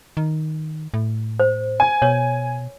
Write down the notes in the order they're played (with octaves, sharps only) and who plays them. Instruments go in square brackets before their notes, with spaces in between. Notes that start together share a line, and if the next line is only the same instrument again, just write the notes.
[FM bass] D#3
A2
[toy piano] C5
[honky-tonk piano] G#5
[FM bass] B2 [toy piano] C#5